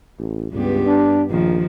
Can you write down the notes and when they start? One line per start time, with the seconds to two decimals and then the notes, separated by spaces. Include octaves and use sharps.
0.19 A1
0.52 C#2 G2 B3 G4
0.86 D4
1.30 A#1 D#3 F3